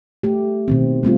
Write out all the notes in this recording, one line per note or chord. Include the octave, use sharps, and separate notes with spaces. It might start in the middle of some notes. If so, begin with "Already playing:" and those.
A3 G4
B2 D#3 C4
G3 A3 C4 F4